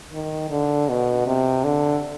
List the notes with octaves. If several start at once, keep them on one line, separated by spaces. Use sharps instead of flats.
D#3
D3
B2
C3
D3